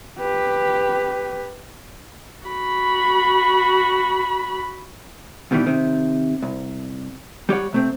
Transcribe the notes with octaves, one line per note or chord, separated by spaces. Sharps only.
G4 B4
F#4 B5
C2 B2 D#3 E3 G3
C3 D#3
C2
G3 G4 C#5 F#5
C3 A3 C4